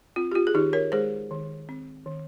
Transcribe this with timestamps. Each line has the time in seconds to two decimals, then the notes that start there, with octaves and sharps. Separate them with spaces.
0.16 C4 F4
0.31 G4
0.35 F4
0.47 G#4
0.54 D#3 D#4 G4
0.73 A#4 C#5
0.92 G#3 G#4 C5
1.31 D#3
1.69 C4
2.06 D#3